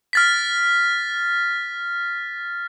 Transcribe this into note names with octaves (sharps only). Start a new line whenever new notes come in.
F6 A6 B6